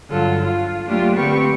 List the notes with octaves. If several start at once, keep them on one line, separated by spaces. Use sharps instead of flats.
G2 D3 F#3 F4 A4
F4
F#3 A3 A#3 D4 F4 G4
D3 C4 G4 B4 C#6